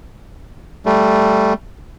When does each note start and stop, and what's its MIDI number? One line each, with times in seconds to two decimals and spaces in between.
0.86 1.53 55
0.86 1.53 57